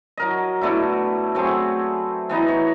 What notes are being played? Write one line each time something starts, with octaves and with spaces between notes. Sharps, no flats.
F#3 A#4 D#5
B2 A3 D4 E4
F#3 A3 C4 G#4
E3 B3 D#4 D#5
C#5